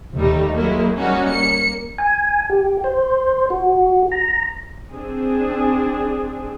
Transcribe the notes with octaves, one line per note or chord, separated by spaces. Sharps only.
D#2 G3 A3 D#4
F#3 G#3 A#3 E4
G3 A#3 C#4 D#4 F#4
A#3 C#7
G#5
G4
C5
F#4
A#5
C4 D4 G#4